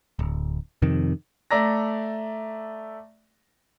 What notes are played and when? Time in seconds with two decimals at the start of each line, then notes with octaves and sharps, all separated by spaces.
0.19 D1
0.82 F2 C3 D#3
1.51 A3 D5 E5 A#5 A#6